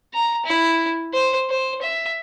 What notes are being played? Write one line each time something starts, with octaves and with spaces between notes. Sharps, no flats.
A#5
E4
C5
C5
E5